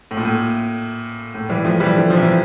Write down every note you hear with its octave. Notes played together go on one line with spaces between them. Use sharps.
A2
A#2
A2
A2
E3 G3
F3 A3
E3 G3
D3 F3
F3
C3 E3